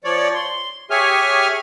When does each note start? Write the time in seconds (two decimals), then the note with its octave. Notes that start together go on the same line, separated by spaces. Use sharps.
0.04 F3 C#5 D5
0.35 C6
0.90 G4 G#4 C#5 E5 G#5 F6